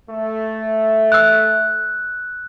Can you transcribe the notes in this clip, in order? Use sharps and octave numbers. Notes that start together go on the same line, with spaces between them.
A3
E6 F#6